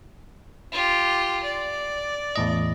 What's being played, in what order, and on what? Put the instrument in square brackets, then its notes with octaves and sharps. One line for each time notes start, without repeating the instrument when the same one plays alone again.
[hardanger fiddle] F4 G4
D5
[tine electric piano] E2 A2 D#5